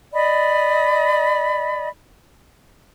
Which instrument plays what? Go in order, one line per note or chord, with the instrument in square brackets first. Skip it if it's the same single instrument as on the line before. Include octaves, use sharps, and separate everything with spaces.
[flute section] D5 D#5 B5